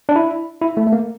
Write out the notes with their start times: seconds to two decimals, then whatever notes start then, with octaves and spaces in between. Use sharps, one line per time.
0.09 D4
0.16 E4
0.62 E4
0.77 A3
0.87 A3
0.92 A#3